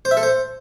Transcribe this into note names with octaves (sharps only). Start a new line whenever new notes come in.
C5
E5
A4
C5